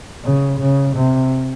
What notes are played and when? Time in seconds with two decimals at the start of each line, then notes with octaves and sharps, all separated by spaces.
0.24 C#3
0.60 C#3
0.96 C3